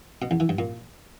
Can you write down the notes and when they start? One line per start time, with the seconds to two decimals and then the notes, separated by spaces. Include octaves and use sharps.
0.22 B2
0.31 E2
0.40 E3
0.49 G2
0.59 A#2